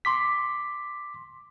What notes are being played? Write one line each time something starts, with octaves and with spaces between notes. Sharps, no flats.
C6 D6 B6